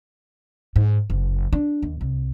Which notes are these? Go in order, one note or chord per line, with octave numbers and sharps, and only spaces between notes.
G#2
F#1
D4
D#2
C2